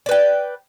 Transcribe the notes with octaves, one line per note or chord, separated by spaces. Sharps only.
B4 D5 G5